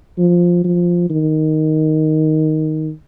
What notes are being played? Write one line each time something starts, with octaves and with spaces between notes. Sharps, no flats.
F3
F3
D#3